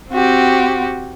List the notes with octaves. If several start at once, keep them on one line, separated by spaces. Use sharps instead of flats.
C4 F#4 G4